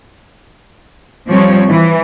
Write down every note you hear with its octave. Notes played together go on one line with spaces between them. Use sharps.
F3 G3 C4 C#5
E3